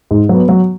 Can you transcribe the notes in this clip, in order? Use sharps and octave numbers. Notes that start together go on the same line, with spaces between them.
G#2
F#3 B3
F#3